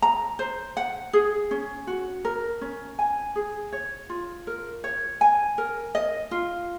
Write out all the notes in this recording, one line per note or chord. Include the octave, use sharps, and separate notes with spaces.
A#5
C5
F#5
G#4
C#4
F#4
A#4
C#4
G#5
G#4
C#5
F4
A#4
C#5
G#5
A#4
D#5
F4